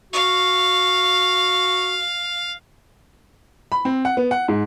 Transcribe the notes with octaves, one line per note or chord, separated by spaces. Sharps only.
F#4 F5
B5
C4
F#5
B3
F#5
G#2